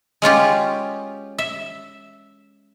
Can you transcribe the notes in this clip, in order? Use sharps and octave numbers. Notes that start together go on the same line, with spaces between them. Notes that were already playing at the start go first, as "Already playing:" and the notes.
G#3 C#4 F4 G4
E5